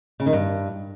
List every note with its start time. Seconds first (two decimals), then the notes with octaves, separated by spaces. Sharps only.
0.20 C#3
0.26 D#3
0.33 G2